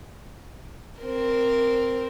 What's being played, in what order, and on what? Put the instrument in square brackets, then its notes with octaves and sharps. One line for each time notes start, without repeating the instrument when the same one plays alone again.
[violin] C4 A#4